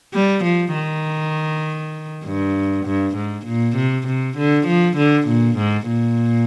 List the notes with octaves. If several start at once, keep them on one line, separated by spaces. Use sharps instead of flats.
G3
F3
D#3
G2
G2
G#2
A#2
C3
C3
D3
F3
D3
A#2
G#2
A#2